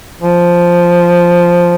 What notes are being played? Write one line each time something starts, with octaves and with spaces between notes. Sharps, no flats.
F3